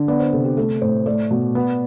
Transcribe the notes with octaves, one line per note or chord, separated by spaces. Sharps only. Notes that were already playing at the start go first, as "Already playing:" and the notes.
Already playing: D3
B3 D5
C5
C3 A4
G4
A3 A4
A2 C5
A3 D5
B2
B3